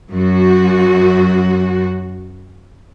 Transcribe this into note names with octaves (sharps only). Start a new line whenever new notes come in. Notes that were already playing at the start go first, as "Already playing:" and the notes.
F#2 F#4